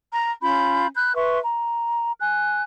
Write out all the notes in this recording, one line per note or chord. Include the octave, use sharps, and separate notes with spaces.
A#5
C#4 F4 B5 G6
B5 F#6 G6
B4 E5 C6 C#6
A#5
G#5 F#6